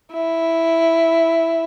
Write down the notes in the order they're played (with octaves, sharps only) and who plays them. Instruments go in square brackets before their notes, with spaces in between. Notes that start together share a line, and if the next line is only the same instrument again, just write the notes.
[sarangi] E4